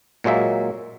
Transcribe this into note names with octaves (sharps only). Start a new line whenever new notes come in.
A#2 F#3 G#3 A#3 E5